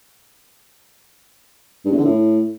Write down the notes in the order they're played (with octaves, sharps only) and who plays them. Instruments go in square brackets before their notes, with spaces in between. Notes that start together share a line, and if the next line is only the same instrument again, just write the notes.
[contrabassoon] G2
E2
D3
A2